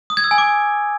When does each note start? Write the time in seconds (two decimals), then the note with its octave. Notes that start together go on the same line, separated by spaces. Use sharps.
0.10 D#6
0.17 G#6
0.24 E6
0.31 G#5
0.38 D6